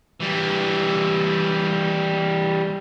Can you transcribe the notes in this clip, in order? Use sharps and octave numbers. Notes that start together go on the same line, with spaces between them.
E3 G3